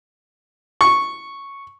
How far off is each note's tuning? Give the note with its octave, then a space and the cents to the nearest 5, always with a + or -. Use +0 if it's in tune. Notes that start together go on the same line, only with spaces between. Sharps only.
C#6 -5